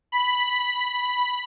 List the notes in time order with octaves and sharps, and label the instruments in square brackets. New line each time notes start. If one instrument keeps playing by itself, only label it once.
[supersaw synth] B5